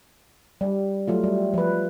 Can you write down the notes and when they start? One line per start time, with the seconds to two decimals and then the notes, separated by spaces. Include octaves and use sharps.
0.61 G3
1.08 F#3 A3 F4
1.24 G3
1.54 F3 B4